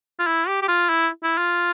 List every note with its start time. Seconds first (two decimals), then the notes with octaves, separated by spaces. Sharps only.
0.19 F4
0.27 E4
0.48 G4
0.62 G4
0.68 F4
0.89 E4
1.23 E4
1.38 F4